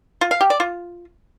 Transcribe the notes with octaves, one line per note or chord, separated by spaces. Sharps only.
F4
F5
G4
D5
F4